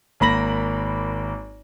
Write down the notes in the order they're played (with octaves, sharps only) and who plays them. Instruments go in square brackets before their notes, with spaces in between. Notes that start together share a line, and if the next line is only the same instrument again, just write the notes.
[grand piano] G#1 A#3 B5 A#6 F#7